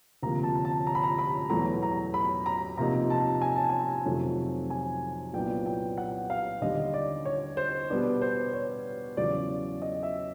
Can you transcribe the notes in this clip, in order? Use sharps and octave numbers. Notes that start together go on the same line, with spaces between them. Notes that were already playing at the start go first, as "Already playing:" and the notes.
D2 C3 F3 A#3 A#5
A5
A5
A#5
B5
A#5
B5
E2 B2 F#3 A3 A#5
A#5
B5
A#5
C3 F3 A#3 D#4 A#5
A5
G#5
A5
G#5
F2 C3 D#3 F#3 A3
G#5
C2 A#2 F#3 B3 D4 G5
G5
F#5
F5
D#2 D3 G3 D#5
D5
C#5
C5
B2 G3 B3 D4
C5
C#5
E2 C#3 F#3 D5
D#5
E5